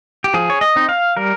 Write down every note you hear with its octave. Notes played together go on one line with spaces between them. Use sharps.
G4
F3 G#4
C#5
D#5
C4 D#4
F5
G3 A#4